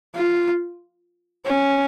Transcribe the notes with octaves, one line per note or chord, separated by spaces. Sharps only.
F4
C#4